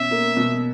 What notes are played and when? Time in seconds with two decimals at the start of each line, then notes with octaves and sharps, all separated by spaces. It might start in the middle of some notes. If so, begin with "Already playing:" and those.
Already playing: B2 C#4 E5
0.11 A#3
0.37 B2